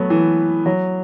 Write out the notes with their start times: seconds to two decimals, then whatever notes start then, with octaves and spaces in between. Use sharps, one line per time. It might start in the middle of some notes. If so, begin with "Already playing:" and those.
Already playing: F#3 A3 B3
0.10 E3
0.66 F#3